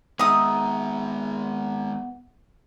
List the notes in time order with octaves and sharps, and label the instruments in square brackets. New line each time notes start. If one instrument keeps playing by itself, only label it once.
[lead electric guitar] D#3 G#3 [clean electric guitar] B3 E5 [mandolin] D#4 D#6